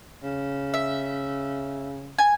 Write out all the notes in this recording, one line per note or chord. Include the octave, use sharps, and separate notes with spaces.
C#3
E5
G#5